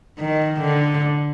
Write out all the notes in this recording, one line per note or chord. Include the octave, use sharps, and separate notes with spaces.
D#3
D3